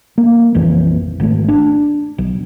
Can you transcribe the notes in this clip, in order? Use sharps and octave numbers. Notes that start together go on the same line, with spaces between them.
A#3
A#1 F2 E3
G#1 A3
D4
B1